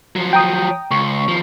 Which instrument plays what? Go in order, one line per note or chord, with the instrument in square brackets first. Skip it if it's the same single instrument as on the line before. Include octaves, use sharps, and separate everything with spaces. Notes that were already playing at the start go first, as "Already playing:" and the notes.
[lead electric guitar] F3 F#3
[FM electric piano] G5 A#5 D#6
[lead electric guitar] C#2 [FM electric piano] C#6
[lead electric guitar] D#2 F3